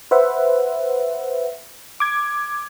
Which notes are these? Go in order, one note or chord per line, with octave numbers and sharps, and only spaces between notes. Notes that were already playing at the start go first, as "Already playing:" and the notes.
B4 C5 E5 F#5
D6 G#6